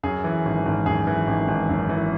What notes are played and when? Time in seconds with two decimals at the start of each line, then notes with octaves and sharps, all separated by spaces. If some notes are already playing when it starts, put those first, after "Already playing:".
0.03 F#2 G#4
0.24 E3
0.45 G#1
0.66 G#1
0.86 F#2 G#4
1.07 E3
1.27 G#1
1.48 G#1
1.69 F#2
1.89 E3